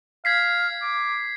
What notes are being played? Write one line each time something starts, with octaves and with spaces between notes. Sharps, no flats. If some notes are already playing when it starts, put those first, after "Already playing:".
F5 G#6 B6 C7
D6